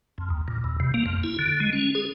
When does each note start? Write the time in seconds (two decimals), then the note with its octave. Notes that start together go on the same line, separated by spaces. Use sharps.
0.18 F2
0.30 D#2
0.48 A#2
0.64 E2
0.80 C3
0.94 A#3
1.06 F2
1.24 E4
1.39 D3
1.60 G#3
1.73 C#4
1.95 G#4